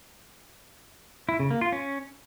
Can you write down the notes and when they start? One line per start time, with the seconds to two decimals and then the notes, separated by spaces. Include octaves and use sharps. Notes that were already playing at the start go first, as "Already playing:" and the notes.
1.29 E4
1.40 C#3
1.50 A#3
1.61 F4
1.72 C#4